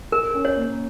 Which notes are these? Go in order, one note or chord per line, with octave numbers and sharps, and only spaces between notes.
A#4
C#4
C#5
A#3